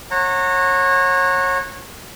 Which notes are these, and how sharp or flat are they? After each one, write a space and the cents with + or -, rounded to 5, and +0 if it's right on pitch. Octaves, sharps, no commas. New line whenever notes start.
C#5 -30 F#5 -15 A#5 -25